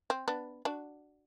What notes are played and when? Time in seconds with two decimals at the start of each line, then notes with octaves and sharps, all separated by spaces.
0.10 C4
0.28 B3 D4
0.65 D4 F#4